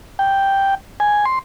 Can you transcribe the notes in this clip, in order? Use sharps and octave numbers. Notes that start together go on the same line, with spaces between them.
G5
G#5
C6